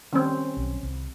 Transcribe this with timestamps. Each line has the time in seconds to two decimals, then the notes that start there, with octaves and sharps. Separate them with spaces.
0.13 D#3 G3 C4 C#4
0.57 B1
0.83 C2